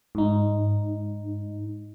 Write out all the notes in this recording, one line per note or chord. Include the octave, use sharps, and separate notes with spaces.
G#2 D#4